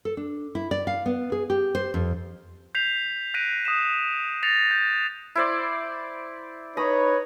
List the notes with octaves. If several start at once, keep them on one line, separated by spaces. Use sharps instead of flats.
A4
D4
E4
D5
F5
B3
G#4
G4
C5
F2
G6 B6 C7 F7
F#6 A#6 B6 D7 D#7 F7
D#6 B6 E7
A6 A#6 C7 C#7 F7
G6
E4 C5 D5
D#4 B4 C#5 A#5 B5 D#6